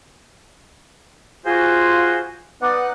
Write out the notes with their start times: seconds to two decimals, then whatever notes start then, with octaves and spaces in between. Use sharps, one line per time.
1.45 F4 F#4 G#4 C5
2.62 B3 D#4 D5 F#5